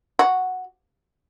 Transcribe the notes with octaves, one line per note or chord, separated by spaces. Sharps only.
F#4